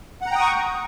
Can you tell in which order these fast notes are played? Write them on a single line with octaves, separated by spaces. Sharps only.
F#5 A#5 G5 D#6 C#6